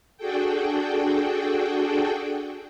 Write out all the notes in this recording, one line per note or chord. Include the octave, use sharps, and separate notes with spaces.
D4 F#4 G#4 A4 G5